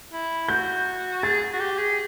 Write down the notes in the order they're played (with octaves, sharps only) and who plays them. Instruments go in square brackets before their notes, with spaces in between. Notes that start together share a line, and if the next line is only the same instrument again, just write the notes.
[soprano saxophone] E4
[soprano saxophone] F#4 [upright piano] G6
[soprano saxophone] G#4 [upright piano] A6
[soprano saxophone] F#4
G4
G#4